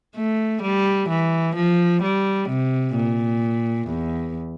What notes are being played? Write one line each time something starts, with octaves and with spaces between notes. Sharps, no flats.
A3
G3
E3
F3
G3
C3
A#2
E2